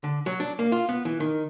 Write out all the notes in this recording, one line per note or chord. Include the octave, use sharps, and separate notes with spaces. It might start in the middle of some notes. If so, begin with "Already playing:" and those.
D3
F#3
D4
A#3
F4
B3
E3
D#3